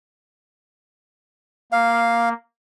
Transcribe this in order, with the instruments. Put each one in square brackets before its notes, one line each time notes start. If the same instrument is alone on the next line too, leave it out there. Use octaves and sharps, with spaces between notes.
[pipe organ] A#3 [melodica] F5